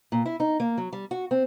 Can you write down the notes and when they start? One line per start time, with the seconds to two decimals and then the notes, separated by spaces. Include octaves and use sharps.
0.12 A#2
0.26 E4
0.40 D#4
0.60 A#3
0.78 F#3
0.93 G3
1.11 F#4
1.31 C4